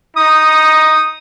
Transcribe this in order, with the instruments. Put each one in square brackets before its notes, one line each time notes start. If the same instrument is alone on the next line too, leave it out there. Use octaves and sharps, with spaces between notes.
[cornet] D#4 [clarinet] D#6